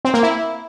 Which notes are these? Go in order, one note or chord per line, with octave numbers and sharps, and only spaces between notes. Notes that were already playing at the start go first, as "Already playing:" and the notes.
C4
A#3
E4